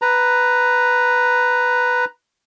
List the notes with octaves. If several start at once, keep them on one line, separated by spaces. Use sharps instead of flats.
B4 A#5